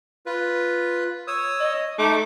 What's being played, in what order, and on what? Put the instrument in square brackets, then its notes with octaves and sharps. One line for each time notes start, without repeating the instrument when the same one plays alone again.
[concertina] F4 B4
C#5 D#6 E6
[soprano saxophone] D#5
[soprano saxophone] A3 [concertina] D#4 D6